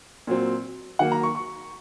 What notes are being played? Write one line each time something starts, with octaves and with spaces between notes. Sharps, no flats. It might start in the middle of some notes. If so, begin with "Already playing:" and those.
A#2 F#3 C4
D#3 F#3 A#3 F#5
A#5
C#6
C#6